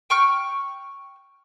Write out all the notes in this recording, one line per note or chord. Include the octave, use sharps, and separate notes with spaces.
G5 C#6 F6